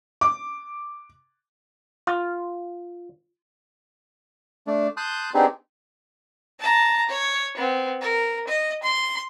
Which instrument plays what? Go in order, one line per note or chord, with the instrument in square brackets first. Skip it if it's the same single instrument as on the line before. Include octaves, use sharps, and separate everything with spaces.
[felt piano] D6
[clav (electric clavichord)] F4
[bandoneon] A3 D4
A5 C6 D#6 F#6 G6
B3 C4 D4 D#4 G4 G#4
[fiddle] A5 A#5
C#5
B3 C4
A#4
D#5
C6